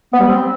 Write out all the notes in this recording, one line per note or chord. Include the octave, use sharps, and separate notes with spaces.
B3
G3
C4